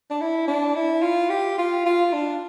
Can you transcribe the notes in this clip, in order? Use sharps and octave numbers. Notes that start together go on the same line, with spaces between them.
D4
E4
D4
E4
F4
G4
F4
F4
D4